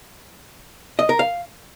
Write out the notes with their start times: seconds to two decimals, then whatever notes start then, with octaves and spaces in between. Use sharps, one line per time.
0.99 D#5
1.09 A#4
1.19 F5